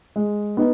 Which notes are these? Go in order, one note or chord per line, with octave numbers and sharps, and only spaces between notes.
G#3
B3 D#4